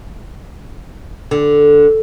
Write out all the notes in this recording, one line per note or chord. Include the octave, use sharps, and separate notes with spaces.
D3